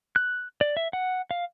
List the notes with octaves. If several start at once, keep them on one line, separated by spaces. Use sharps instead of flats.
F#6
D5
E5
F#5
F5